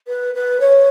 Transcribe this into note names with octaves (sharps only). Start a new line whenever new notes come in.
B4
B4
C#5